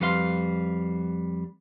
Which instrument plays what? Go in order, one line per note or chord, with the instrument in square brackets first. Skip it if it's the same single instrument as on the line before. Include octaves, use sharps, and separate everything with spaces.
[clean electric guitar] F2 G3 B4 F5 C6